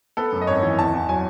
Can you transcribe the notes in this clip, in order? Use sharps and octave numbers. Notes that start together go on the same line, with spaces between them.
B3 A4
F#2
D#5
G#1 C#5
E3
E2 A5
E2
F#3 G#5